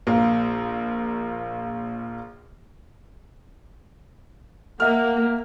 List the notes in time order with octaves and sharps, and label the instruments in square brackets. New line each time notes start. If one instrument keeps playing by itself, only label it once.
[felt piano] A#1 A#3
[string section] A#3 [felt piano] E5 F6 [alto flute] F#5